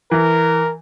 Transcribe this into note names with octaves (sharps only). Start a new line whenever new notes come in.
E3 A#4